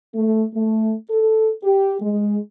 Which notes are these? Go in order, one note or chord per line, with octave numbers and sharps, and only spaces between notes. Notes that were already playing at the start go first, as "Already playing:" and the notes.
A3
A3
A4
G4
G#3